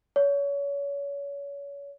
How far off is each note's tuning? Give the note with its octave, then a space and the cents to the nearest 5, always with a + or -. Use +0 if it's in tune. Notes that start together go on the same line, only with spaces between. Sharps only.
C#5 +30